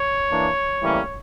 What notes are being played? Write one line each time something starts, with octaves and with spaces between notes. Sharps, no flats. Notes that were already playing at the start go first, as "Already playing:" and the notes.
Already playing: C#5
E3 A#3 D4
A2 E3 G3 A#3 C#4